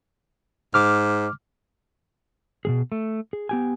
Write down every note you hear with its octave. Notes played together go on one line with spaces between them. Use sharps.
G#2 D6 F6
B2 F3 G#4
A3
G#4
B3 G4 G#5